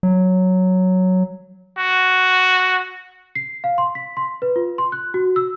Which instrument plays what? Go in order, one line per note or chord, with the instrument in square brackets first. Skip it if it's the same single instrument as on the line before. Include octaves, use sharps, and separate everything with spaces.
[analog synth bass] F#3
[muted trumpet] F#4
[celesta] C7
F5
C6
B6
C6
B4
F4
C6
F#6
F#4
E6